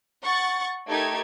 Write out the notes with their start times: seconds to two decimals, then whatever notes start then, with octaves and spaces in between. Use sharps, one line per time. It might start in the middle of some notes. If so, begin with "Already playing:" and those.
0.23 F#5 C#6 A6
0.87 A3 D#4 G4 A4 A#4 G#6